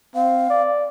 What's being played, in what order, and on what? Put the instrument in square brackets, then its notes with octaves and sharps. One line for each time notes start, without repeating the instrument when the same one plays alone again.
[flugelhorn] C4 [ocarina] F5
[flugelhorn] D5